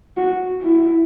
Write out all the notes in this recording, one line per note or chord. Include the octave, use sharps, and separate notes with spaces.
F#4
E4